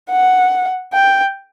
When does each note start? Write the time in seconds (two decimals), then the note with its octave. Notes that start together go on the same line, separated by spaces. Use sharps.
0.10 F#5
0.93 G5